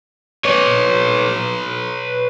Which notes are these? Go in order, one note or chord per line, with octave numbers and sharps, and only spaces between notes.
B4 C#5